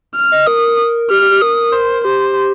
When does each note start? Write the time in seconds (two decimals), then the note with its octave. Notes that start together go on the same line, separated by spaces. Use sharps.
0.16 F6
0.32 D#5
0.47 A#4 D#6
1.10 G4 F6
1.21 G4
1.31 G4
1.42 A#4 D#6
1.73 C5
2.05 G4 C5